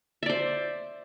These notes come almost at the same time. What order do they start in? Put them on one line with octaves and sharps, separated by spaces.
E5 D5 C5